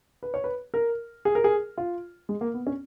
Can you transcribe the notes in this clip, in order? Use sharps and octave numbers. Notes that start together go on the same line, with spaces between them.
B4
C#5
B4
A#4
G#4
A#4
G#4
F4
G#3
A#3
B3
C#4